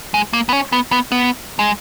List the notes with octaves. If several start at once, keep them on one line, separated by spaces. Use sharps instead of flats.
G#3
A#3
B3
C#4
B3
B3
B3
G#3